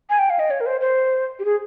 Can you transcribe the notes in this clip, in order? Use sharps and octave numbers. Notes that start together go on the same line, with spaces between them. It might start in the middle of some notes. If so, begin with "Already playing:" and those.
G#5
G5
F5
D#5
C#5
A#4
C5
C5
G4
G#4